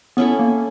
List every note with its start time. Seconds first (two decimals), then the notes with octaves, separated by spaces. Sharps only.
0.17 B3 C#4 E4 A4
0.39 A#3